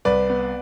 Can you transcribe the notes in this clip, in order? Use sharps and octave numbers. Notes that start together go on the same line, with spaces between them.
C2 B4 D5
B3